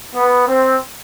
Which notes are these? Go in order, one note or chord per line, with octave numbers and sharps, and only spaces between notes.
B3
C4